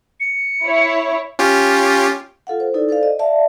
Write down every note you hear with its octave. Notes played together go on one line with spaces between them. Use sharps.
C#7
E4 C#5
C#4 F4 G4
F4 A4 F5 F#5
C5
D#4 E4 A4 B4 D5
A4 C5 D5 F5
D#5
D5 E5 F5 A5